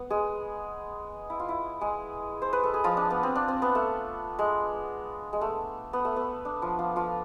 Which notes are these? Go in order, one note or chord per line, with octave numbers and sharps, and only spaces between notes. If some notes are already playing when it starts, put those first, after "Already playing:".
Already playing: B3
G#3 G#4
E4
F4
E4
G#3 G#4
C5
B4
A4
G#4
F3 F4
D4
B3
C4
D4
C4
B3
A3
G#3
G#3
A3
B3
A3
B3
D4
F3 F4
F3 F4
F3 F4